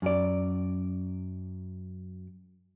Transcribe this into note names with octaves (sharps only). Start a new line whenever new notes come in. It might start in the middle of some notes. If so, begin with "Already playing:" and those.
F#2 D5